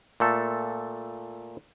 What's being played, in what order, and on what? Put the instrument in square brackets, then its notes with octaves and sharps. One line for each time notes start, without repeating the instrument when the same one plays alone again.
[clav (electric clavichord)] A#2 A3 A4